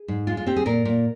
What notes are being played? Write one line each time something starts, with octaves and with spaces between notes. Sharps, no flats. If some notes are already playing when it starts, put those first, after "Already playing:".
Already playing: G#4
G#2
G#3 F4
F4
C4 G4
G#4
A#2 A#4
A#2